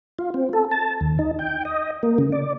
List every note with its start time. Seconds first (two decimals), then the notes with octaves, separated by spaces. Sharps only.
0.19 F4
0.34 C4
0.53 A4
0.71 A5
1.01 D#2
1.19 D#4
1.39 G5
1.65 D#5
2.03 A#3
2.18 C#3
2.32 D5